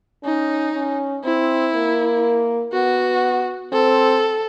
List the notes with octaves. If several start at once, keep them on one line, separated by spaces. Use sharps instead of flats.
C#4 D#4
C#4
C4 E4
A#3
B3 F#4
C4 A4